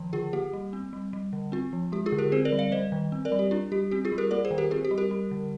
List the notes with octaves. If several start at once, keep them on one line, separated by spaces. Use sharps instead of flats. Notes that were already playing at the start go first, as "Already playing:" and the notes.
Already playing: D#3 F3
D3 F4 G#4
A#3 G4
G3
C4
G3
G3
D3
C4 F4
F3
G#3 G4
F4 G#4
D3
G4 A#4
C4 G#4 C5
A#4 D5
G3
D5 F5
G3 C5 D#5
D#3
C4
A#4 D5
G3
G4
D4 F4
G3 G4
C4 G4
F4 G#4
G3
G4 A#4
A#3 A#4 D5
G#4 C5
D#3
G4 A#4
C4 F4 G#4
G4
G3
G4 A#4
G3
D3